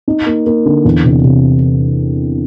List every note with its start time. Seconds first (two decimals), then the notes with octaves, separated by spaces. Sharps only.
0.08 D#4
0.26 A#3
0.46 A#3
0.65 D3
0.85 E2
1.04 C3
1.24 C3